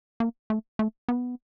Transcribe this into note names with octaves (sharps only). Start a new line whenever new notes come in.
A#3
A3
A3
B3